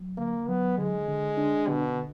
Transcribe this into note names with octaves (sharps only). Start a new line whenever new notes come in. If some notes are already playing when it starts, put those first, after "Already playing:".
Already playing: F#3
D3 A#3
F#3 B3
D3 G#3
D3
D4
B2 D3